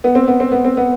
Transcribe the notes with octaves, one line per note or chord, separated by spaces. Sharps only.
B3
C4
B3
C4
B3
C4
B3